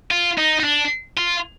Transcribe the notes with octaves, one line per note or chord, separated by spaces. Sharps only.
F4
D#4
D#4
D4
F4